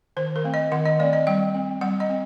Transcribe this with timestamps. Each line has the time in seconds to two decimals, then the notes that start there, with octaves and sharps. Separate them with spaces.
0.17 D#3 C5
0.36 A#4
0.44 A3 C4
0.54 D#5
0.72 D#3 F#5
0.86 D#5
1.00 A3 C4 D5
1.13 D#5
1.27 G3 G5
1.55 C4
1.81 G3 F#5
2.00 D#5
2.09 C4